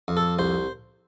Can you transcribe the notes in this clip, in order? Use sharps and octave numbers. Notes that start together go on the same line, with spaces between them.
F2
A4
C2 C5